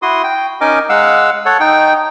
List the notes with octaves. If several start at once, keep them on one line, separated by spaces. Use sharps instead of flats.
E4 F#4 C6 D#6
G5
C#4 D#4 A#4 D#5 G#5 D6
G#3 F5 F#5 E6
A4 C#5 F#5
D#4 G5